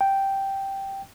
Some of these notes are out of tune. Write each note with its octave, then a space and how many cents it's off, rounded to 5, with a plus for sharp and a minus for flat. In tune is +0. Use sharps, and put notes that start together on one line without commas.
G5 -5